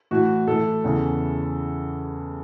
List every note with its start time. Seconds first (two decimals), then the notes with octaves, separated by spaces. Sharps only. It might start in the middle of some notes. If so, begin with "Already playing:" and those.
0.11 A2 E3 F#4
0.47 A2 E3 A4
0.84 E2 C#3 E3